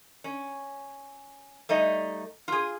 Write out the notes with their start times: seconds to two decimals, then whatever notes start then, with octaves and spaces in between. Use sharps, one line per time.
0.24 C#4
1.69 G3 A3 D#4 D#5
2.48 F4 G#4